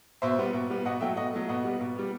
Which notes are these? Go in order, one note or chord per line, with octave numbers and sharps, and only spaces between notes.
B2 C5 E5
G3 B3
B2
G3 B3
B2 D#5 F#5
F#3 A3 E5 G5
B2 D#5 F#5
F#3 A3
B2 D#5 F#5
G3 B3
B2
G3 B3